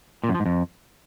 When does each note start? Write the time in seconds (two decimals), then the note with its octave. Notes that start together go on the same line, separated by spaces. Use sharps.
0.24 A#2
0.29 F#2
0.35 F3
0.40 G#2
0.46 F2